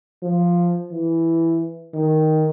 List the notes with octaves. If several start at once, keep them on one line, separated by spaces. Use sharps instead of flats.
F3
E3
D#3